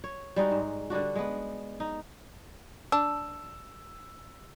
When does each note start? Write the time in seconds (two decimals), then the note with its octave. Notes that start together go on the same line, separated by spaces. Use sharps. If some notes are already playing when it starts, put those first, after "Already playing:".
0.04 C#5
0.36 G3 G#3 D#4 F#4
0.51 G#2
0.90 D3 G3 D4 F#4
1.15 G#3 B3
1.80 D#4
2.92 D4 E6